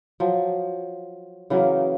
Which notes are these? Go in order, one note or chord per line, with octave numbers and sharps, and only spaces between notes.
F3 F#3
C#3 E3 F#3 A#3